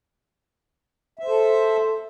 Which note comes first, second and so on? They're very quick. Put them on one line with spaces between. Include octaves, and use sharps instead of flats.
E5 C5 A4